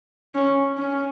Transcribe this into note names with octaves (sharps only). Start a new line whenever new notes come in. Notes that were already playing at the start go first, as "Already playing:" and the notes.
C#4
C#4